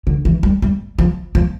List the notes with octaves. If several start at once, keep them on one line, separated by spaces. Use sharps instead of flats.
D3
E3
G3
G3
F3
F3